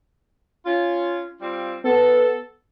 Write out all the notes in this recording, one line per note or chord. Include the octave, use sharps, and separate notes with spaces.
C#4 F4
G3 C4 F4
B3 A4